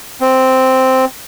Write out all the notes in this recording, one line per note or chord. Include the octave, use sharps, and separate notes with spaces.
C4